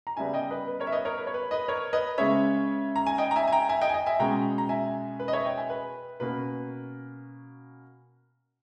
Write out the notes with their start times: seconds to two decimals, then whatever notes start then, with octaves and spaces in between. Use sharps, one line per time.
0.07 A#5
0.17 C#3 G3 B3 E5 G#5
0.34 D#5 G5
0.51 B4 D#5
0.68 B4
0.80 A#4 C#5
0.87 E5
0.92 B4 D#5
1.05 A#4 C#5
1.17 B4
1.27 C#5
1.34 B4
1.51 B4 D#5
1.68 A#4 C#5
1.93 B4 D#5
2.18 C#3 G#3 C#4 C#5 E5
2.96 A#5
3.06 G#5
3.18 D#5 G5
3.31 A#5
3.36 E5 G#5
3.47 G#5
3.52 G5 A#5
3.69 E5 G#5
3.81 D#5 G5
3.89 G#5
3.94 D#5 G5
4.06 E5 G#5
4.19 B2 G#3 C#4 G5 A#5
4.58 A#5
4.69 E5 G#5
5.20 B4
5.28 D#5
5.33 C#5 E5
5.45 D#5 G5
5.57 E5 G#5
5.70 B4
6.20 B2 A#3 C#4 B4